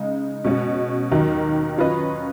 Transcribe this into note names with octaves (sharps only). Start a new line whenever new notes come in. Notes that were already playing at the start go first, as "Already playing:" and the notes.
Already playing: C#3 G#3 D#4
B2 G#3 C#4 F#4
D#2 D#3 F#3
F#3 C#4 F4 B4 D#5